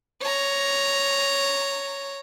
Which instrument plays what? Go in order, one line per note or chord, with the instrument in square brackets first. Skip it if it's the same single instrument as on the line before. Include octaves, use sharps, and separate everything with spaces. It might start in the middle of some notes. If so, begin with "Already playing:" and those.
[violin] C#5 A#5